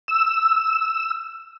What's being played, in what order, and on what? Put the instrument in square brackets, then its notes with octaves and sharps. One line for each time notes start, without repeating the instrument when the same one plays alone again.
[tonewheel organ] E6